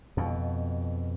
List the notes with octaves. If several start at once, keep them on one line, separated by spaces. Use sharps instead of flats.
F2 B2